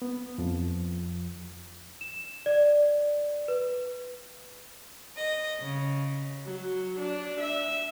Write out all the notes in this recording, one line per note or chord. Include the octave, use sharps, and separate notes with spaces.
B3
F2 F3
E7
D5
B4
D#5
C#3
F#3
D4
E5